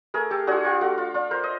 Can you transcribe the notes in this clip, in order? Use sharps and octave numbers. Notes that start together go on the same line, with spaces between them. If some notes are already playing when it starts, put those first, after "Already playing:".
A3 G#4 A#4
G4 A4
D4 F4 F#4 G#4
F4 G4
A3 F#4
F4
D4 F4
A#4 C5
D#5